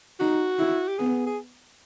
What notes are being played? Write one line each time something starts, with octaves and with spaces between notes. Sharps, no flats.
D#4 F#4
E4
G4
B3 G#4
G#4